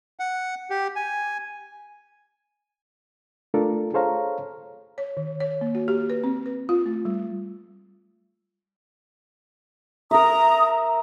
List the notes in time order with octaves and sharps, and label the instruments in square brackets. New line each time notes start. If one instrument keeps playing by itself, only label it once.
[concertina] F#5
G4
G#5
[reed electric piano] A3 D4 F4 A4 A#4
G#4 A4 C5 C#5 F5 A#5
[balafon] C#5
D#3
C#5
A#3
F#4
G4
B4
C4
B4
F4
A3
G3
[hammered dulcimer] A#4 E5 [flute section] A#5 D#6